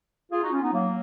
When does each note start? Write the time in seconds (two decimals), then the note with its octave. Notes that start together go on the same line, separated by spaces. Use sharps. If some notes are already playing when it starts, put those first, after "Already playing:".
0.32 F4 G#4
0.42 D#4 F#4
0.53 C#4 F4
0.62 B3 D#4
0.73 F#3 A#3